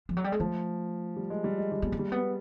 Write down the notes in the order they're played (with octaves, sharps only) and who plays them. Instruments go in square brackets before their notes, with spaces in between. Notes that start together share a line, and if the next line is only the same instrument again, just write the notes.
[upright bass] F3
F#3
G3
G#3
[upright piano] F3 [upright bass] A3
[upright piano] G3
G#3
G3
G#3
G3
[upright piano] G#3 [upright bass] B3
[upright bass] A#3
[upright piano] G3
[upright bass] B3